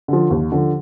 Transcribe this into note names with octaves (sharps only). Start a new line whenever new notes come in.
D3 F3
D#2
D3 F3